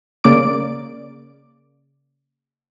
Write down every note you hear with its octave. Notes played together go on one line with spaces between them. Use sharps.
C#3 A#3 D5 D6 D7